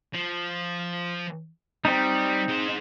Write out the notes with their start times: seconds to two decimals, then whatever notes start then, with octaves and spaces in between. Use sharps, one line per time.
0.14 F3
1.85 G3 C4 D#4
2.49 G#3 C5